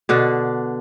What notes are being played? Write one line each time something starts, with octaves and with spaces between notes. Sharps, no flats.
B2 D3 D4